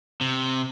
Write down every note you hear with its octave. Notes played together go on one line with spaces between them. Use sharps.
C3